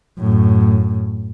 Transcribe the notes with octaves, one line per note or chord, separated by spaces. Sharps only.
F#2 A2